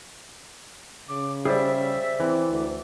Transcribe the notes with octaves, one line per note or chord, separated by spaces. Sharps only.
C#3 D6
G3 G#4 C5 D5 E5
E3 C4 D6
D2